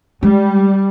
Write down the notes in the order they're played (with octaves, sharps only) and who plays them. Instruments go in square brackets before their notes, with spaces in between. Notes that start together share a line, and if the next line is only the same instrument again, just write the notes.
[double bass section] G3 [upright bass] G#3